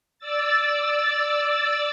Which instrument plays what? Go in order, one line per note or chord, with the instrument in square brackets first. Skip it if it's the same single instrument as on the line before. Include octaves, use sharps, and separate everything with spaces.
[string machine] D5 E6 A6